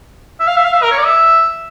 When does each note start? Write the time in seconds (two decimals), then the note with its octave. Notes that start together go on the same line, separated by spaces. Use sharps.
0.40 E5
0.47 F5
0.56 E5
0.64 F5
0.73 E5
0.83 A#4
0.91 C#5
0.98 D5
1.06 E5